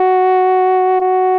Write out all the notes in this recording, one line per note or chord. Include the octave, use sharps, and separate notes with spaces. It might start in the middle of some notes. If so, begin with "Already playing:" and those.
Already playing: F#4
F#4